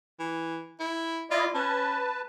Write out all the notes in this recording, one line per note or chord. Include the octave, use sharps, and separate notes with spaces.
E3
E4
E4 F4 D5 D#5
C#4 B4 A5